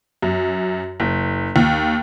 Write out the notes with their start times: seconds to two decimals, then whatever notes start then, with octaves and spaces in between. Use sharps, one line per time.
0.22 F#2
1.00 F#1
1.56 D#2